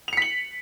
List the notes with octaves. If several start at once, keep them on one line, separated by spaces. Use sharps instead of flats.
B6 C#7 F7 F#7